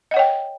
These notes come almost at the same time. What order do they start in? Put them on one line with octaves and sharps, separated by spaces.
D#5 F#5 C#5 G5